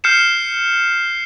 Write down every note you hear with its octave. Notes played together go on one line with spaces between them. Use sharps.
F6 G6 C7 C#7 E7